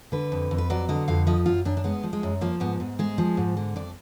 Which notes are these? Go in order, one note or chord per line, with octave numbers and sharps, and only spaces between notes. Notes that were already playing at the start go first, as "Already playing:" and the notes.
D3 B4
F2
F2
B4
F#3 D5
D3 D#5
F2 F5
F3 D#5
F#2 F4
F#2 D4
D4
G#3 B3
F3
G#3
F#2
F3 A#3
G#2 B3
G#2
G#3 G#4
F3
G#2
D3
F2 D5